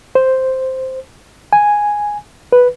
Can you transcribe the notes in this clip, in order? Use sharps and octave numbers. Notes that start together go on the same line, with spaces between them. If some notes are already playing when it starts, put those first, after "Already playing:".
C5
G#5
B4